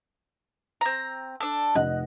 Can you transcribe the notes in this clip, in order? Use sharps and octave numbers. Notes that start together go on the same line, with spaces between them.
C4 A#5
D4 A4
F1 D#5 F#5 F#6